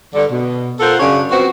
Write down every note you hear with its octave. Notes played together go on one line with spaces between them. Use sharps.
G2 D3
B2
F4 A4 A#4 C5 F#5
F#2 C#3 C#4 D4 C#5
F3 B3 C4 F#4